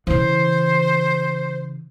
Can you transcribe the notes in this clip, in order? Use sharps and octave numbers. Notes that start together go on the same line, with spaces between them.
C#3 E3 C5